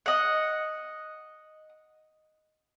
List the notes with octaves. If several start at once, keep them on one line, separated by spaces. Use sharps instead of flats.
D#5 F#5